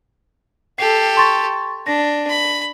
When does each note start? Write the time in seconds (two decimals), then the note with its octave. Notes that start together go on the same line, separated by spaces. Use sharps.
0.79 G4 A4 C7
1.17 C6 C#6 A6
1.87 D4 A#6
2.30 B5